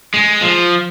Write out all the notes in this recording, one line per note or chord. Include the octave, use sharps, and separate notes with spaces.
G#3
F3